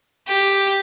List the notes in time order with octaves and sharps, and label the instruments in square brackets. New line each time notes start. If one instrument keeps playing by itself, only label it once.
[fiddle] G4